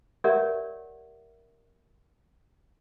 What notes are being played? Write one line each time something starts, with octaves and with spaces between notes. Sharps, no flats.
G4 A#4 C#5 D5 E5 F#5